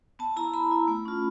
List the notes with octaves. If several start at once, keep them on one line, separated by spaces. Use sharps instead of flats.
B3 A5
E4 A#5
B3 B5
E4
A3
C#4 F4